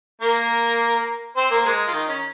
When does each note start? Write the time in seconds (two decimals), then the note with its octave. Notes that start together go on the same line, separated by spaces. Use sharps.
0.21 A#3 A#4
1.36 C4 C5
1.51 A#3 A#4
1.65 G#3 G#4
1.88 F4
1.93 D#3 D#4
2.08 C#4